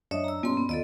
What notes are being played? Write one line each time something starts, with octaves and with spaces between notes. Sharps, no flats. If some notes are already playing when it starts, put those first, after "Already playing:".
F#2 D4 C#5 D#5 E5 D#6
A#5 E6
G2 B2 A#3 C#4 C6
B3
D#2 F4 A4 D5 D#5